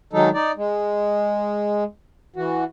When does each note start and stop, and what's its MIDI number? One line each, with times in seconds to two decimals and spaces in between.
0.13 0.29 51
0.13 0.29 54
0.13 0.29 56
0.13 0.29 63
0.13 0.29 69
0.34 0.51 63
0.34 0.51 74
0.57 1.84 56
2.36 2.64 52
2.36 2.64 66